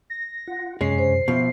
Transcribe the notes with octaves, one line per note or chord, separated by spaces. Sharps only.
A#6
F4 F#5
F#2 C3 G#3 C#4 C7
C5
B2 F3 E5